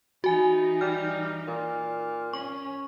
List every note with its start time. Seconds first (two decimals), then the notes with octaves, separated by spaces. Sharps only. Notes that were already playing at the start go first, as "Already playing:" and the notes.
0.24 E3 D#4 F#4 G#5
0.81 G3 F6
1.47 A#2
2.33 C#4 C#6